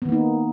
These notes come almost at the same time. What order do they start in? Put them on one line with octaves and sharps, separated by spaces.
B3 D#3 A#3 D#4